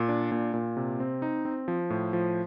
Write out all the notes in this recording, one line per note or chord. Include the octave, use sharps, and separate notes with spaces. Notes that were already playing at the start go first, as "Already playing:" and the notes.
Already playing: A#2
D4
A#2
A#2
C3
C4
D#4
C4
F3
A2
F3